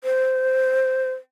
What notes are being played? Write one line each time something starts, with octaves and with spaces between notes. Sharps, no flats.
C5